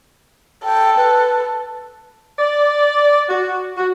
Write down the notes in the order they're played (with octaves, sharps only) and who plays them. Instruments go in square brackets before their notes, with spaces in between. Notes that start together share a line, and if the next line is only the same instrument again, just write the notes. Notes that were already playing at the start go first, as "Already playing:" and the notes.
[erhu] A4 [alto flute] G5
[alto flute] B4
[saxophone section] D5
F#4
F#4